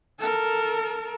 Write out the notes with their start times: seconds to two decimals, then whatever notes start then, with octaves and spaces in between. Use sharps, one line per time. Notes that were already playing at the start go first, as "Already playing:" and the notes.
0.19 A4 A#4